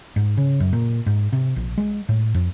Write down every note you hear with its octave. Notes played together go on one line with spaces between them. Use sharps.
G#2
C#3
F#2
A#2
G#2
C3
A#1
G#3
A2
F2